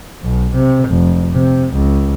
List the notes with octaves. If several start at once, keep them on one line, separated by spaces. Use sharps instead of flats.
B1
C3
F1
C3
C#2